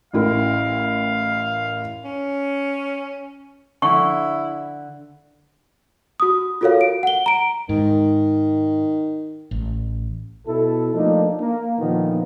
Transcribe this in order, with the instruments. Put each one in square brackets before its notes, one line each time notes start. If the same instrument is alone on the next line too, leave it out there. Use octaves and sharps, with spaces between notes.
[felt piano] A1 E4 A#4 [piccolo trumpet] F5
[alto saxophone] C#4
[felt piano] D3 [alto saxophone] E4 [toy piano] C#6
[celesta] F#4 D#6
F4 F#4 A4 A#4 C#5 F5
D7
F#5 G7
A#5 D7
[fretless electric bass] G#2 [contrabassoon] D#3
[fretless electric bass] A1
[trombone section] B2 E4 A4
F3 A3 A#3 D4 D#4
A#3
A#2 D3 D#3 F3 B3